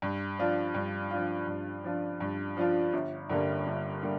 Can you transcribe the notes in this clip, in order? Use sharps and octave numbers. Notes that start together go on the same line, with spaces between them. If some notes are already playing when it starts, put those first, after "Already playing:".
G2
F3 D4 F4
G2
F3 D4 F4
G2
F3 D4 F4
G2
F3 D4 F4
G1
G2 D3 G3 A#3
G1
D3 G3 A#3